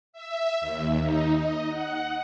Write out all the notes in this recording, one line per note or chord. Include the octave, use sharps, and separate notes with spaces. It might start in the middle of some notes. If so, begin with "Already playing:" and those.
E5
D#2
D#4
D#5
F#5